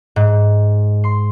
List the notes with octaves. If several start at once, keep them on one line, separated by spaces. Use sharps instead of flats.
G#2
C6